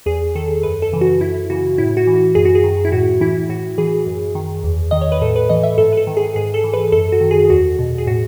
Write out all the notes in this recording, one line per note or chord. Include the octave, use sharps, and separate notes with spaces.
E2 G#4
D#3 A4
F#2 B4
A4
C#3 E3
F#4
F#2 E4
C#3 E3 F#4
A2 E4
F#4
E3
F#4
F#2 G#4
F#4
G#4
D#3
E4
A2 F#4
E3 E4
A2 F#4
E3 G#4
F#2
D#3
E2
D#3 D#5
C#5
B4
A2 A4
B4
E3 D#5
E5
G#2 A4
B4
A4
D#3
G#4
G#2 G#4
A4
E3
B4
F#2 A4
F#4
D#3
G#4
E2 F#4
B2
G#4
A2 F#4